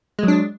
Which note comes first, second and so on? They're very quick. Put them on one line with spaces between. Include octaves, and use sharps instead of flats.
G#3 F#3 D4